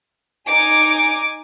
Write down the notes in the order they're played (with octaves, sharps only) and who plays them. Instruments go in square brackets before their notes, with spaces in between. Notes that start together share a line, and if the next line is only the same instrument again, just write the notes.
[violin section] D#4 G#5 D6 D7